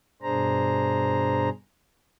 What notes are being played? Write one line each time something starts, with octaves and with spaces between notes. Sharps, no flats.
G2 B2 D4 G#4 C5 A#5